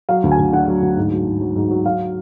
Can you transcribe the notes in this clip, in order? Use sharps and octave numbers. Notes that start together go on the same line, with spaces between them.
F#3 F5
D2
G#5
D2
D3 F#5
F#3
D2
G#2
F#3
G#2
F#3
G#2
F#3
F#3 F5